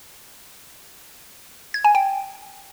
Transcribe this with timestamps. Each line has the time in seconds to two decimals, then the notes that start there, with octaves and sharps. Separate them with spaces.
1.74 G#6
1.84 G#5
1.95 G5